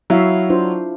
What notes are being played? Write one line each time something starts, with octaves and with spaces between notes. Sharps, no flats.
F#3 E4 E5 F5
D4 F4 C5